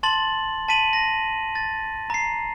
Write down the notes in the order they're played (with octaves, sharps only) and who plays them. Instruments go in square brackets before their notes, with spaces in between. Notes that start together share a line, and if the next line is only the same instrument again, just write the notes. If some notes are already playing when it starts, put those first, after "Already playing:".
[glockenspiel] A5 C6 A6 F#7
A5 B6 D#7 F#7
A#6
A6
A#5 C7